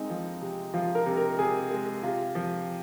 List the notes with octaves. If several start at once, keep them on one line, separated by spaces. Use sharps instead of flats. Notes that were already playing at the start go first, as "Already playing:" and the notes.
Already playing: G#3 C4 D#4
F3
C3
F3 F4
A#4
C3
A#4
C3 G#4
G#3
C3 F4
F3